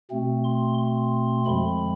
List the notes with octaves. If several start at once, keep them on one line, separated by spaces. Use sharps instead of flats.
B2 A3 C4
C6
C6
F2 D3 F3 G#3 C4 B5